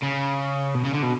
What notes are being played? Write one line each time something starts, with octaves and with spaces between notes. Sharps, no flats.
C#3
B2
C#3
D3
B2